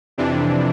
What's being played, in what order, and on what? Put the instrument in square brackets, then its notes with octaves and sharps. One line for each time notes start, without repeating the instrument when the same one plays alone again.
[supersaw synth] F2 C3 E3 D4